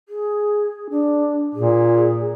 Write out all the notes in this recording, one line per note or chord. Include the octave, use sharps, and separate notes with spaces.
G#4
D4
A#2 G#4